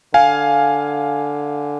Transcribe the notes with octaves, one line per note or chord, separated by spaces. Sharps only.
D3 F5 G#5